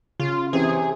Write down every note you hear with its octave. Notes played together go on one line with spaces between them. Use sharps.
C#3 F4
C3 E3 C4 C#4 G#4